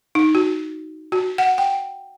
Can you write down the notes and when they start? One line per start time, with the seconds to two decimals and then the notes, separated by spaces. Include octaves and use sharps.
0.15 D#4
0.35 F#4
1.12 F#4
1.38 F#5
1.58 G5